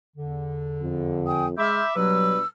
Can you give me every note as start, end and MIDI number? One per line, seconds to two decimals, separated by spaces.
0.16 1.49 40
0.16 1.49 50
0.82 1.56 41
1.26 1.46 79
1.26 1.46 80
1.26 1.46 87
1.58 1.81 56
1.58 1.95 76
1.58 1.93 83
1.58 1.85 84
1.58 1.93 86
1.58 1.85 89
1.58 1.85 91
1.96 2.40 47
1.96 2.34 54
1.96 2.42 55
1.96 2.40 62
1.96 2.40 71
1.96 2.48 88
1.96 2.48 89